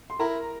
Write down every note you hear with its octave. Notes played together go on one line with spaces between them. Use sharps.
C6
E4 A#4 A#5